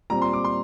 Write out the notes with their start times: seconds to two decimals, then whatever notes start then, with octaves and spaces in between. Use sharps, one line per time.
0.10 A#2 G3 C4 A#5
0.22 C6
0.33 D6
0.44 C6